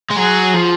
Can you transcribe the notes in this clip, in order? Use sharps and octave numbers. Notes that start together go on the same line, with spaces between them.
G#3
F#3 G#4
F3